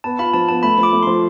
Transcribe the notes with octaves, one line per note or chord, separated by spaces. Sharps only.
B3 A5
F4 B5
F3 A5
B3 A5
A3 B5
F3
D6
A3
F3 C6